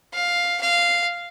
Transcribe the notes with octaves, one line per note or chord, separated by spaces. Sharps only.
F5
F5